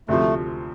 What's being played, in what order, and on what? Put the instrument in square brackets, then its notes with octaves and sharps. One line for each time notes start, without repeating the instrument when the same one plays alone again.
[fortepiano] D2 C3 F3 [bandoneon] A3